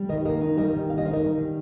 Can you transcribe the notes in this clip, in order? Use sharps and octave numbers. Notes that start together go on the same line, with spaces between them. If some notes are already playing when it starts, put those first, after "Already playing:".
Already playing: G3
D#3 A#4 D#5
A#3 A#4 D#5
D#4
G3 A#4 D#5
D#3
A#3 F5
D#5
D#4 C5
A#4 D#5
G3
D#3